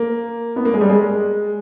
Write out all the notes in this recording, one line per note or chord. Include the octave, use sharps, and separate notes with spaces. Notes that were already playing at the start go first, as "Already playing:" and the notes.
Already playing: A#3
B3
A#3
G#3
G3
G#3